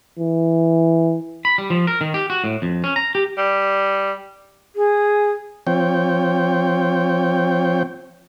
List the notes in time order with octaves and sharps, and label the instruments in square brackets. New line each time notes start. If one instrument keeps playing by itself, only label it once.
[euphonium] E3
[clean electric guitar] B5
G3
F3
A#4
D#3
G4
F#4
A2
F2
C#4
A#5
G4
[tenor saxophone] G3
[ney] G#4
[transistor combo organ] F3 C4 C#5 G5